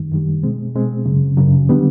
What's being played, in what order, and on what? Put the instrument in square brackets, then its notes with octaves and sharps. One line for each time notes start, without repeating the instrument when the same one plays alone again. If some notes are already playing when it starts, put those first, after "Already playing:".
Already playing: [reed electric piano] F#2 D#3 G3
F#2 D#3 G3
B2 G#3 C4
B2 G#3 C4
F#2 C#3 F#3
F#2 C#3 F#3
D3 G3 B3